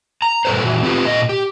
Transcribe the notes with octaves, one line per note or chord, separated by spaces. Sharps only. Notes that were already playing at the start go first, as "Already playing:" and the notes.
A#5
G2 A#2 A4 B4 C5
A#2 E3 F#4
C4 F4 G4 B4
A#2 A4 D#5
G4